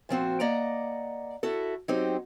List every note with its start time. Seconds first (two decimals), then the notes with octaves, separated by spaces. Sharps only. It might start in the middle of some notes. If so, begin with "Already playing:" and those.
0.09 A#2 F3 C4 F#4
0.40 A#3 D5 D#5 F#5 A#5
1.43 E4 F#4 A4
1.88 F#3 C4 D#4 G4 C5